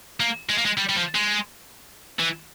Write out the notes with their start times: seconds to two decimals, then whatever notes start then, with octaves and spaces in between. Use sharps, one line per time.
0.20 A#3
0.49 G#3
0.58 A#3
0.66 G#3
0.78 G3
0.89 G3
0.96 F3
1.15 G#3
2.19 E3